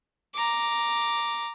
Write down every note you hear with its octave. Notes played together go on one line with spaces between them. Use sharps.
A#5 D6